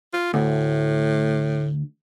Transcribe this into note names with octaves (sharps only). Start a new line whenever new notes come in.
F4
D2 A2